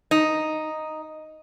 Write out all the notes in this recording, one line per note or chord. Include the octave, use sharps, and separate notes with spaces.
D#4